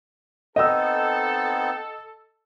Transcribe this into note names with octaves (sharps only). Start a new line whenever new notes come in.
B3 C4 D#4 A4 D#5 E6